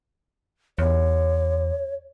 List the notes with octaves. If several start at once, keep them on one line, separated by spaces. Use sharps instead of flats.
E2 C#5